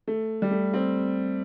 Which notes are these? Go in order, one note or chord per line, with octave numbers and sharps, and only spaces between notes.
A3
G3
A3
C4